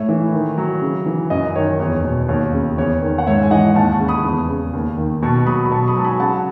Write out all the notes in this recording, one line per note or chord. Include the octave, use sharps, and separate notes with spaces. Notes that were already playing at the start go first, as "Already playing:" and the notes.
Already playing: A2 C#5 E5
E3
D#3
F#3
C#3
E3
F#2 D#5
D#3 C#5
E2 C#5
B2
D#2 C#5
C#3
E2 C#5
D#3
F#5
G#2 C#5 E5
G#5
E3 D#5 F#5
D#2 F#5 A5
A5 C#6
C#3
B5 D#6
E2
C#3
D#2
D#3
B2 A5 C#6
F#3 B5 D#6
B5
B2 A5 C#6
B5 D#6
F#3 A5
G#5 B5
C#3 F#5 A5